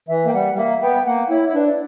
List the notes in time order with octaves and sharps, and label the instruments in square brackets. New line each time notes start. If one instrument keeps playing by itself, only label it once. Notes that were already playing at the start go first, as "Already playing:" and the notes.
[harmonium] E3 [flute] E5
[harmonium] A#3 [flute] G5
[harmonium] G3 [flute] F#5
[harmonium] G3
[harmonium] A#3 [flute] E5
[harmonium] B3 [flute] G5
[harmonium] A#3 [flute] F#5
[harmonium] E4 [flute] C#5
[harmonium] E4
[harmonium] D4 [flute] B4
[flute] D5